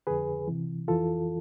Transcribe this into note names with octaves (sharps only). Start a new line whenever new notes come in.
F2 D3 G#4 B4
C2 C3 E3
F2 E3 F4 A4